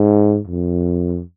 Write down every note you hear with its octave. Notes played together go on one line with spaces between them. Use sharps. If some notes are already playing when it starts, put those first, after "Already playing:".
Already playing: G#2
F2